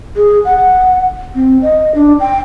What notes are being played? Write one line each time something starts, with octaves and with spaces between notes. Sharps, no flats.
G#4
F#5
C4
D#5
D4
G5